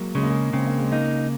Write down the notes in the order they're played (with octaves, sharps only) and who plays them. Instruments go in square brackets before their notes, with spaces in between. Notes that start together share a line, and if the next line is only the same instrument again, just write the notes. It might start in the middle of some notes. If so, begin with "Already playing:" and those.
Already playing: [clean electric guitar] F#3 [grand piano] G#3 A#3
[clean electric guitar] C#3 [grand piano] G#3
[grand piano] A#3
G#3
[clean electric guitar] C#3 [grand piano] C4
[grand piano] A#3
G#3
[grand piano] A#3 [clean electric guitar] D#4